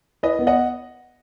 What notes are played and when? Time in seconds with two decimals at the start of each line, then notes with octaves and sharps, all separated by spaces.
0.23 E4 B4 D#5
0.39 B3
0.47 D#5 F#5